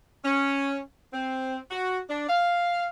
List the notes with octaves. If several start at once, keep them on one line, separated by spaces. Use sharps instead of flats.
C#4
C4
F#4
D4
F5